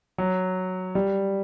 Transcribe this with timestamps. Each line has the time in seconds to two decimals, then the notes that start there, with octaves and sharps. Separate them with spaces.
0.18 F#3
0.95 G3